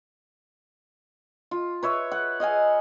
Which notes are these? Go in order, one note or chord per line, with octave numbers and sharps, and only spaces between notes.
F4
B4 C#5 E5
F#5
D#5 F5 F#5 G#5